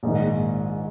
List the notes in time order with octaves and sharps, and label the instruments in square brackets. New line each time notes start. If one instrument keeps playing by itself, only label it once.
[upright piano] A#1 G#2 D#3